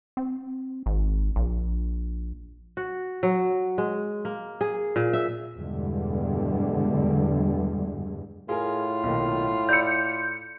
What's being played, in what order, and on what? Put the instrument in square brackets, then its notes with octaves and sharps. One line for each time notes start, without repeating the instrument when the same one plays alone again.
[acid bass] C4
G#1
A#1
[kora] F#4
F#3
G#3
A#3
G#4
A#2
E5
[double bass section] E2 G2 B2 D3 G3 G#3
[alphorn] A2 [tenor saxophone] F4 [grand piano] G#4 A#4 G#5
[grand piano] B1 A#2 D#3
[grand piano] D5 B5 E6 [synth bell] G6 C#7